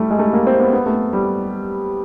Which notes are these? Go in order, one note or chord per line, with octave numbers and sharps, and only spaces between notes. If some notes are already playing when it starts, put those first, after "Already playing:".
Already playing: G3 A3
G#3
A3
A#3
C4
B3
B3
A3
G3